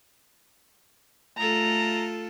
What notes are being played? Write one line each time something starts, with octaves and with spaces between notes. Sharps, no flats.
A3 F4 A4 A#5